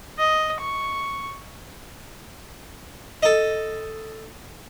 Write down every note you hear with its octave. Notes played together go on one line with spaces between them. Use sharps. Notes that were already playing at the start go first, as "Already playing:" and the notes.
D#5
C#6
A4 D#5